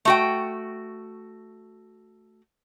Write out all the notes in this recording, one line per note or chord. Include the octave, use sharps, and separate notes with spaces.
A3 F#4 G5